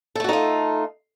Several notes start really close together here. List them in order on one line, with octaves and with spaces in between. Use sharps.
A4 A3 F#4 D#4 F4